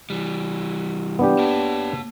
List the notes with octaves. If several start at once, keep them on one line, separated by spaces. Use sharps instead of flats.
E3 G3
B3 D4 G4
A#3 C#5 A5